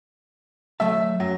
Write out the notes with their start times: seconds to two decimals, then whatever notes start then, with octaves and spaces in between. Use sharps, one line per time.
0.80 F#3 A3 E5 A5
1.20 F#2 F#3